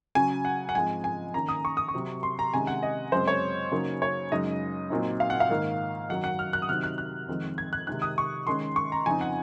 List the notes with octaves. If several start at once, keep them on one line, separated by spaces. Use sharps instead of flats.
C#3 F#3 C#4 G#5
F#5
F#5
G#2 F3 G#3 C4 G#5
G#5
D#3 A#3 C#4 A#5
D#6
C#6
D#6
C#6
C3 F#3 C4
C6
A#5
C3 D#3 G#3 C#4 G#5
F#5
D#5
F#2 C#3 G#3 C4 C5
C#5
C#3 F#3 A#3 D#4
C#5
F#2 C#3 G#3 D#4 D#5
A#2 F#3 C4 D#4
F5
F#5
F5
G#2 D#3 A#3
F#2 D#3 F#3 F#5
F#5
F6
F#6
D#6
C3 D#3 F#3 C4 D#4 F6
F#6
F#6
F2 D#3 G#3 C4
G#6
F#6
C3 D#3 G#3 C4 D#4 F#6
D#6
C#6
D#3 G#3 C#4 C6
C#6
A#5
F2 C#3 F3 C4 D#4 G#5
F#5